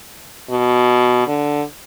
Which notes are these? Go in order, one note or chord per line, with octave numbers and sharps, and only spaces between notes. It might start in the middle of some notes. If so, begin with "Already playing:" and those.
B2
D3